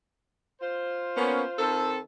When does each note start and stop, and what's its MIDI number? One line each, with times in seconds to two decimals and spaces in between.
0.61 1.91 65
0.61 1.91 72
1.17 1.43 58
1.17 1.43 59
1.17 1.43 61
1.59 1.98 51
1.59 1.98 60
1.59 1.98 69